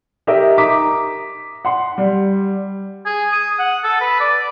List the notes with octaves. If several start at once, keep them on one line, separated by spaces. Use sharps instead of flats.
D#4 G4 A#4 D#5 E5
A#5 D6 D#6 B6
F#5 C6
G3
G#4
D#6
F#5
A4
B4
D5